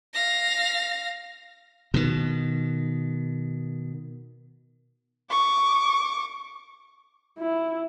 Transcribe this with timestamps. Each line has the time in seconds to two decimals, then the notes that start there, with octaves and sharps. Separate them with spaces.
0.14 F5 A#6
1.94 B2 D#3
5.30 C#6 D6
7.39 E4